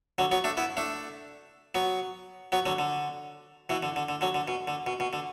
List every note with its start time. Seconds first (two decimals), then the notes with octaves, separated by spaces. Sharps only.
0.18 D3 F#3
0.31 F#3 B3
0.44 A3 D4
0.57 B3 E4
0.77 A3 D4
1.75 F#3 B3
2.52 F#3 B3
2.66 D3 F#3
2.79 D3
3.69 B2 E3
3.83 D3
3.96 D3
4.09 D3
4.21 D3 F#3
4.35 D3
4.48 B2
4.68 D3
4.86 B2
5.00 B2
5.13 D3